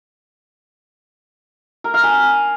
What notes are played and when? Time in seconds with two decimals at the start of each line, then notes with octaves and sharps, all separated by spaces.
1.84 A#4
1.94 F5
2.03 G#5